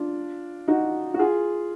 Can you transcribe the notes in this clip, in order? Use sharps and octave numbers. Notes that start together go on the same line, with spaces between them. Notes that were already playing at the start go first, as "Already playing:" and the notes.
Already playing: D4 F4
D#4 F#4
F#4
F4 G#4